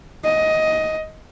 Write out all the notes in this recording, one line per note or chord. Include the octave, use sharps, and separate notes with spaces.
D#5